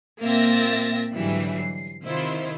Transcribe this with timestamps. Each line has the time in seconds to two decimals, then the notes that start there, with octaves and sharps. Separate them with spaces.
0.21 A#2 A#3 C4 E5 A6 A#6
1.14 G#2 D3 E3 F#3 G3
1.57 C7
2.04 C3 D#3 E4 F4 C5